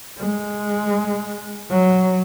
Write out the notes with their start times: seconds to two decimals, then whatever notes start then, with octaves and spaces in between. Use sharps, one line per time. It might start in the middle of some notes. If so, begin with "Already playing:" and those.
0.19 G#3
1.70 F#3